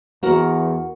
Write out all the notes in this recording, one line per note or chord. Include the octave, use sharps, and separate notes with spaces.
E2 F#4 A#4 F#5